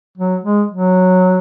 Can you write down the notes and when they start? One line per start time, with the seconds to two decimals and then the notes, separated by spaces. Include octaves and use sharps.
0.17 F#3
0.44 G#3
0.71 F#3